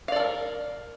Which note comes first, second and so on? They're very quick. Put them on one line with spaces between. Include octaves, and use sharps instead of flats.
F5 D5 A4 A#4